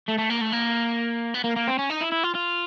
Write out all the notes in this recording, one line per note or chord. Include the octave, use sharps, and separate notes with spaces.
A3
A3
A#3
A3
A#3
B3
A#3
A#3
C4
C#4
D#4
E4
E4
F4
F4